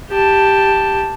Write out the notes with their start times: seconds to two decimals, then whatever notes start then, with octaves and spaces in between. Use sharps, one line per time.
0.10 G4 A5